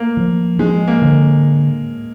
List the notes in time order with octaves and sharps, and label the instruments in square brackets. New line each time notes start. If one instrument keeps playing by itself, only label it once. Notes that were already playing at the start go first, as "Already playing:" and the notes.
Already playing: [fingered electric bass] A3 [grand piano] A#3
[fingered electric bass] F3
[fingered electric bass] F3 [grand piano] G#3
[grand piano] A#3
[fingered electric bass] D3